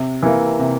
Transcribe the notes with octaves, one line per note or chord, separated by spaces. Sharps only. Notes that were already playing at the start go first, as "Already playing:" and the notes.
Already playing: C3
E3 A#3
C3